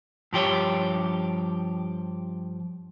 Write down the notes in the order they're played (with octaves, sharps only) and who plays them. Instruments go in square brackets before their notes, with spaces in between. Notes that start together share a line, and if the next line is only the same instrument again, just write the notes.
[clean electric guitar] G2 F3 G4 C#5